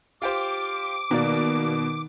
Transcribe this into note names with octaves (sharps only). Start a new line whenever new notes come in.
F4 G4 C5 D6
B2 D#3 A#3 D5